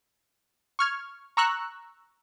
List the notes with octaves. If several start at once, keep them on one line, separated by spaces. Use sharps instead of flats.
C#6 F6 G#6
A#5 C#6 E6 F#6